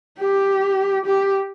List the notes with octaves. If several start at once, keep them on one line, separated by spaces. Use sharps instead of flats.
G4
G4